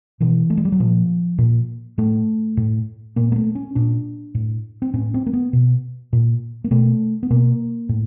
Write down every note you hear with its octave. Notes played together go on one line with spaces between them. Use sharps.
B2 E3
A3
G#3
G3
F#3
A#2 F3
A#2
A2 A3
A2
A#2 A#3
A#3
A3
C#4
A#2 D4
A2
C4
A2 C#4
C4
A#3
B3
B2
A#2
A#3
B2 A3
B3
B2 A#3
A2